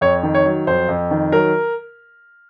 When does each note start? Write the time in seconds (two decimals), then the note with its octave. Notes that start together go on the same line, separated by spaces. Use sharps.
0.01 F2 C#5
0.23 D#3
0.34 C#5
0.45 F#3
0.67 F2 C5
0.88 F2
1.11 D#3
1.32 F#3 A#4